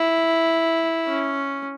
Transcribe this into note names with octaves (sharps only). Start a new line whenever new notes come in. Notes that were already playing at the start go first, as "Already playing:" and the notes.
Already playing: E4
C#4